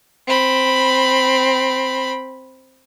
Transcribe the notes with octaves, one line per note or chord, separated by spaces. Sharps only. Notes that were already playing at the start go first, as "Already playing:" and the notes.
C4 B5